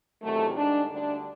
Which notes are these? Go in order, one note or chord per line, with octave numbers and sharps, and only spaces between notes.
E2 C3 D#3 F#3 A3
G#2 D#3 G3 D4
D2 D3 G3 D4